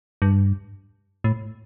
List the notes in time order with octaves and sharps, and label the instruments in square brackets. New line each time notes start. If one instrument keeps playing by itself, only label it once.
[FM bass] G2
A2